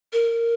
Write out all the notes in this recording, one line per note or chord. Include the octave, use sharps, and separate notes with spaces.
A#4